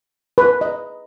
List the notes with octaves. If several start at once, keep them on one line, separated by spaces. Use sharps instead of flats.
B4
D#5